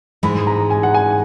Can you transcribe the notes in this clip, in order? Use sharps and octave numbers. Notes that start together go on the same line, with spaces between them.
G#2 E3 G#3 B5
A#5
G#5
F#5
G#5